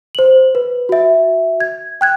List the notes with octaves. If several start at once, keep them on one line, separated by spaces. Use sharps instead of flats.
C5 F#7
B4
F#4 E5
G#6
G5 F#6 G#6